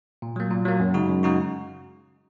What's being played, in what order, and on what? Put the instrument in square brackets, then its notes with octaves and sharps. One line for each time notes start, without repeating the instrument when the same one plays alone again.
[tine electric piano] A#2
F#3 A#3
A#2
F#3 A#3
F#2
C#3 G#3 D#4 F#4
F#2
C#3 G#3 D#4 F#4